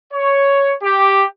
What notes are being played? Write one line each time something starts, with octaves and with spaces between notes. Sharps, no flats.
C#5
G4